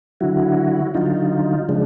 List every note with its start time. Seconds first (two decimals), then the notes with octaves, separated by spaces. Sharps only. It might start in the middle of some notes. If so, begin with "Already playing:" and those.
0.20 D3 F#3 E4 F#4
0.94 D3 F#3 D#4 F4
1.69 C#3 F3 G#3 D4